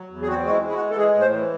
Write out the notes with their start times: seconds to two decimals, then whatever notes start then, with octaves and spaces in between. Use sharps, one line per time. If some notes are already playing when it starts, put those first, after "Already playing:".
Already playing: F#3
0.10 E2
0.22 G#4
0.27 C4 F#4
0.45 G#3 F#4
0.50 E4
0.62 G#3
0.69 E4
0.74 F#4
0.79 E3
0.90 A4
0.96 G#3 G#4
1.14 A2
1.20 C5
1.32 E3